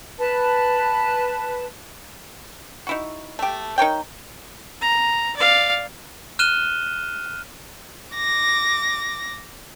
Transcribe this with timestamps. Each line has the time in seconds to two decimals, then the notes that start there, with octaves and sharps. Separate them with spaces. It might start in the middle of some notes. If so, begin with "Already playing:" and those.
0.18 B4 A5
2.87 D#4 E4 F#4
3.39 A3 G4
3.78 D#4 A#4 C#5 G5
4.81 A#5
5.37 D5 F5
6.39 F6 F#6 D#7 E7 G7
8.14 D6 A#6